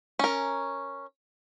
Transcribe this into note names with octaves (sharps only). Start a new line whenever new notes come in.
C#4 A#4